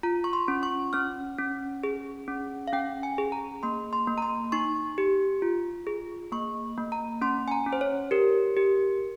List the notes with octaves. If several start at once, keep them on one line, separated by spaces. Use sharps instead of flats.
F4 A#5
C#6
C6
C#4
C#6
C#4 F6
C#4
G#4
C#4
F5
C#4 G5
G#5
G#4
A#5
A#3 C6
C6
A#3
A#5
C6
D#4 C#6
G4
F4
G#4
A#3 C#6
A#3
A#5
C#4 C6
G#5
A#5
C#4
C5
C#5
G4 A#4
G4